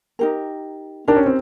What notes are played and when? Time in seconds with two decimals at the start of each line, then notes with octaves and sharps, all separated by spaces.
0.19 D#4 G4 A#4
1.08 D4 D#4 G4 A#4
1.16 C#4
1.26 C4